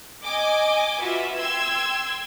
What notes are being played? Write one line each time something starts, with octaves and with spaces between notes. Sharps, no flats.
D#5 G#5 D6
F4 F#4 B4 E5
G5 C6 E6 G#6